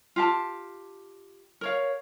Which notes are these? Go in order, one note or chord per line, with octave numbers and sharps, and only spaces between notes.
F4 G4 A5
A#4 C#5 F5